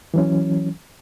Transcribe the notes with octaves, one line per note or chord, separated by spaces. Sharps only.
E3 F#3 C#4